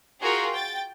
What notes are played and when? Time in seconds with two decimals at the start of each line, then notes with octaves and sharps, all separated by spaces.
0.21 F4 F#4 G#4 A#4 G5
0.51 G5 A6